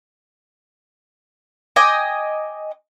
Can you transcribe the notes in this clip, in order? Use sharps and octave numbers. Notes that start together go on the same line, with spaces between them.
D#5 G5 G#5 D6